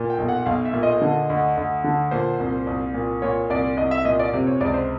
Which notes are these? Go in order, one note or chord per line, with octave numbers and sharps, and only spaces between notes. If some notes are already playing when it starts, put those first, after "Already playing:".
Already playing: A#2
G5
B1
F#5
B1 F5
E5
A#2
D#5
D3
D2
D2
D3
A#2 C5
C2
C2
A#2
A#2 C#5
C2 D5
C2 D#5
E5
A#2 D#5
D5
C3
C#5
C#2 D5
C5